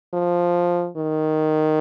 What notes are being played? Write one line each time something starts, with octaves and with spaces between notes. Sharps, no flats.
F3
D#3